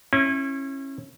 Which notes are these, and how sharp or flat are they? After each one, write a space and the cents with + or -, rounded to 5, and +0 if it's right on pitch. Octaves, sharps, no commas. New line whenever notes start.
C#4 -30 E4 +0